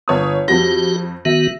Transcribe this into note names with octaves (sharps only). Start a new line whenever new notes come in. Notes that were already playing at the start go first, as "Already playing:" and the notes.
G1 C#5 D#6
F2 F#4 G4 A#6
D#3 B3 F#4 E5